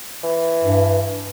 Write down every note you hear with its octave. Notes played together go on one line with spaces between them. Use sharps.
E3
G2